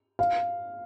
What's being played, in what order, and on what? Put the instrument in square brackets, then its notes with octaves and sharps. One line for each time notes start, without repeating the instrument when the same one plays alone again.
[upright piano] F5